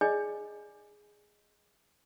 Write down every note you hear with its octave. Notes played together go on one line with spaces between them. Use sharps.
G#4 D5 D#5 G#5